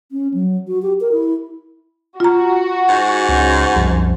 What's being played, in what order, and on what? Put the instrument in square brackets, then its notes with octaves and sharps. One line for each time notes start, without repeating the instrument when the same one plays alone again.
[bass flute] C#4
F#3
F#4
G4
A#4
E4
[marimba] F4 A#5 [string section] F#4
[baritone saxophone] G#2
[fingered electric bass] C#2 C#4
C2 F#2 F3